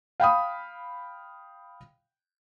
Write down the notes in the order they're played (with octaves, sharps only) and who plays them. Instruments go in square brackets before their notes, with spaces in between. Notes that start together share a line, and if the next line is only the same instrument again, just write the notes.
[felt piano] F5 G5 B5 D#6